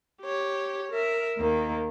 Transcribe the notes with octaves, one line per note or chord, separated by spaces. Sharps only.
G4 C#5
A#4 E5
D#2 D#3 A#3